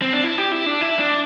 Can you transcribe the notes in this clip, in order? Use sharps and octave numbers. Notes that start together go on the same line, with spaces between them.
C4
D4
E4
G4
E4
D4
E4
D4